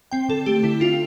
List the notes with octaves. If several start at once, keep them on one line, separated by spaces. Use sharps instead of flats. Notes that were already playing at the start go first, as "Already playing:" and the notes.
C4 G5
D3 A4
A3 G4
D3 E4
D4 F4